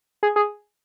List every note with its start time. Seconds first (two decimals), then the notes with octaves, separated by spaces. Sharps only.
0.23 G#4
0.36 G#4